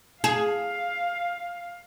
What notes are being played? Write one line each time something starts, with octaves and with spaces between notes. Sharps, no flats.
G#4 F5